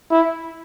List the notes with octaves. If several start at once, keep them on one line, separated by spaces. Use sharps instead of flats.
E4